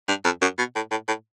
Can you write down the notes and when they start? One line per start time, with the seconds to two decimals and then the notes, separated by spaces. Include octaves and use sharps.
0.08 G2
0.24 F2
0.42 F#2
0.58 B2
0.75 A2
0.91 A2
1.08 A2